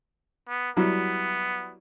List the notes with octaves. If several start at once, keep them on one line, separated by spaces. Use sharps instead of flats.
B3
F#3 G3 B3 E4